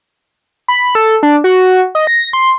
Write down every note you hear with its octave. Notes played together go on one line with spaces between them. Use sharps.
B5
A4
D4
F#4
D#5
A#6
C6